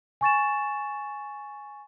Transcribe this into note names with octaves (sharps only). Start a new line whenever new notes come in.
G#5 C#6 A6 E7